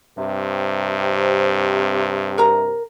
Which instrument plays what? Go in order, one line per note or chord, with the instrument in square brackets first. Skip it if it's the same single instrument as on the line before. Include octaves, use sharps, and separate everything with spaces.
[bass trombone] G2 [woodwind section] C3
[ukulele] A#4 A#5